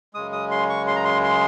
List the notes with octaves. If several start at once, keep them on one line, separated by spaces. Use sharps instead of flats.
F#2 C#3 G#3 D#6
D#6
C6
C#6
C6
A#5
C6
C6